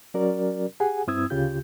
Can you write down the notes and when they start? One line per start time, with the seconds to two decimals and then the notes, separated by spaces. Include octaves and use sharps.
0.14 F#3 C#4 F#4 A#4 D5
0.80 G4 G#4 F#5 G#5
1.07 G2 C4 E4 D#6 E6 G#6
1.30 D2 C#3 F4 G4 G6